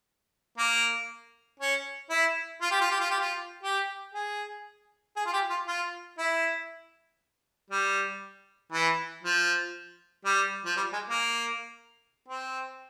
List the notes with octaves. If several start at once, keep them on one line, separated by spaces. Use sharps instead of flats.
A#3
C#4
E4
F4
G4
F4
G4
F4
G4
F4
G4
G#4
G#4
F4
G4
F4
F4
E4
G3
E3
F3
G3
F3
G3
G#3
A#3
C4